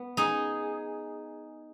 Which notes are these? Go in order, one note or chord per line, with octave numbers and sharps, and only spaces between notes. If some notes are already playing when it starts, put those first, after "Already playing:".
Already playing: B3
D#4 G#4